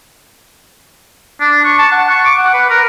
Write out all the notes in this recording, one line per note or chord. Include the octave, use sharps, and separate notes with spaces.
D4
C#6
A5
F#5
C#6
D6
F#5
B4
A#4